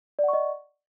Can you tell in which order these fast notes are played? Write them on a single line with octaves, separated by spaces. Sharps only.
D5 F#5 C#6 D#5